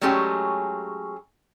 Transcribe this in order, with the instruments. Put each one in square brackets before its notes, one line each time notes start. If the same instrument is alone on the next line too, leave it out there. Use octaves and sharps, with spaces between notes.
[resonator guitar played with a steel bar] F#3 G#3 A3 C#4 G4 G#4